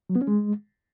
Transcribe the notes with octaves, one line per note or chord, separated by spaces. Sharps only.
F#3
B3
C#4
G#3